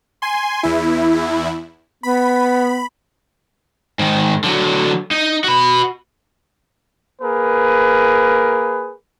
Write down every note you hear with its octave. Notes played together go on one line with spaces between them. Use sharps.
G#5 C6
E2 E4
B3 B5
G#2 D#3
D3 F#3
D#4
F#4 B5
A#3 G#4 A#4 B4